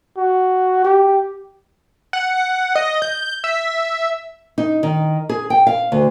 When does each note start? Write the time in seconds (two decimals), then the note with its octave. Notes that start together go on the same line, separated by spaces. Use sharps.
0.17 F#4
0.85 G4
2.13 F#5
2.75 D#5
3.02 G6
3.44 E5
4.58 D#4
4.83 D#3
5.29 G#4
5.50 G5
5.67 F5
5.92 D2